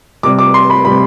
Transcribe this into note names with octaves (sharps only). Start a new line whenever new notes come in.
C3 G3 D6
D6
C6
B5
C3 G3 B5